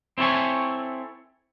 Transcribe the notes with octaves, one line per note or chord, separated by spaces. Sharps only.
C4 E4 A4 C#5 G#5